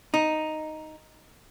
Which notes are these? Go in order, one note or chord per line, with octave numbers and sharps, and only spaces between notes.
D#4